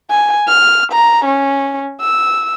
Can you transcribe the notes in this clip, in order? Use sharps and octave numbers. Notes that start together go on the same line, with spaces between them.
G#5
F6
A#5
C#4
E6